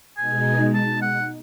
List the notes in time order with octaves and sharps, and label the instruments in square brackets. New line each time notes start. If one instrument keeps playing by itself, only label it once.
[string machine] B2 G#3 D#4 [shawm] G#5
[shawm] A5
F#5